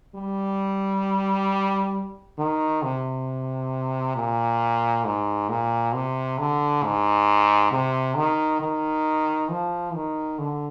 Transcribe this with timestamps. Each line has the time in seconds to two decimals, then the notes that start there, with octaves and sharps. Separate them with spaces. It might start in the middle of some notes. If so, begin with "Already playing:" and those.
0.15 G3
2.38 D#3
2.83 C3
4.16 A#2
5.05 G#2
5.49 A#2
5.94 C3
6.38 D3
6.83 G#2
7.72 C3
8.16 D#3
8.61 D#3
9.50 F3
9.94 D#3
10.39 D3